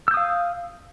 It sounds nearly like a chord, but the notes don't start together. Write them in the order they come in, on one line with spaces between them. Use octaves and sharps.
E6 G6 D#6 F5